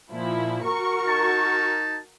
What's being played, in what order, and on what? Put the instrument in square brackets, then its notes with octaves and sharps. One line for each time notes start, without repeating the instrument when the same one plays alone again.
[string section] A#2 F3 E4
F#4 A#4 C#6
[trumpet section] D#4 A5